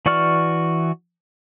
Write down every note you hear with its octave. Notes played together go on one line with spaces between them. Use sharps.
E3 F#4 D5 C#6 F6